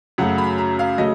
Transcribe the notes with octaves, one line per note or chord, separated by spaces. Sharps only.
F#2 C#3 F#3 A3 F#5
B5
A#5
F5
C#3 F#3 A3 D#5